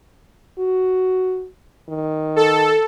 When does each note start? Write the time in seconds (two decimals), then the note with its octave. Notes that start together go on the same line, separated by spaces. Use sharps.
0.58 F#4
1.89 D#3
2.36 A4